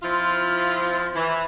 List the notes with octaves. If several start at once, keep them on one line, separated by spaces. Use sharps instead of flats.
F3 C4 E4 F4
E3